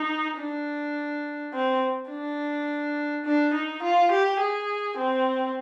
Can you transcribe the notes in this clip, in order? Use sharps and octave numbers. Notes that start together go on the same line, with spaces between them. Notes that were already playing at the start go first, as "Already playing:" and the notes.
Already playing: D#4
D4
C4
D4
D4
D#4
F4
G4
G#4
C4